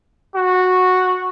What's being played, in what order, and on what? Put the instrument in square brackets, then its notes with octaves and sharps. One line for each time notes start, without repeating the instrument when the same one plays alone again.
[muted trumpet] F#4